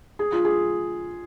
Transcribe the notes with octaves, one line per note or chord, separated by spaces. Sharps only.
G#4
F4
G#4